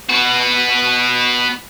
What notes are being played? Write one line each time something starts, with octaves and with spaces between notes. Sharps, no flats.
B3 F#4